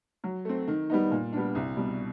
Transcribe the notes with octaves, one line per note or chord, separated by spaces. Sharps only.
F#3
A3 C4
D#3
G3 B3 D#4
A#2
G3 B3 D4
C2
B2 G3